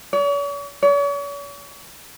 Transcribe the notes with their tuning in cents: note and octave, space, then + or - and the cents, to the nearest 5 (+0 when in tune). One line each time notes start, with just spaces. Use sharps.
C#5 +45
C#5 +40